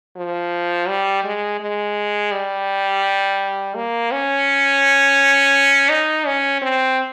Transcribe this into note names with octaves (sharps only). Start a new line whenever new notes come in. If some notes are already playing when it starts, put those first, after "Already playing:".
F3
G3
G#3
G#3
G3
A#3
C#4
D#4
C#4
C4